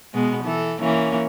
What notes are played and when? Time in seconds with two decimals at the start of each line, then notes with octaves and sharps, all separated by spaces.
0.14 B2 G#3 B3
0.44 E3 A4
0.80 E3 A#3 C#4